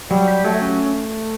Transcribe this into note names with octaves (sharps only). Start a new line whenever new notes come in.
F#3 G3
G4
F#3 A3
C#4